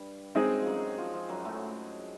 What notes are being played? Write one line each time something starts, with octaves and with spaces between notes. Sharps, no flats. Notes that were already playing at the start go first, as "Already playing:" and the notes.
Already playing: G2 G3
F#2 F#3 G#3 C4 D#4 G#4
F3
F#2 F#3
F3
F3
F#2 F#3
A2 A3